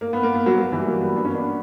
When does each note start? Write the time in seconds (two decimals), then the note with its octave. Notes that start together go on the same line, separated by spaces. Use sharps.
0.01 A#3
0.13 B3
0.23 A#3
0.34 B3
0.46 F#3 A#3
0.59 F#3 A#3
0.72 E3 G3
0.86 F#3 A#3
1.01 G3 B3
1.16 B3 D4
1.25 A#3 C#4
1.34 B3 D4